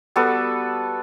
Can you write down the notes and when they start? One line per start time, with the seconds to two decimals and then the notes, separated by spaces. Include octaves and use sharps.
0.16 G3 B3 F#4 A4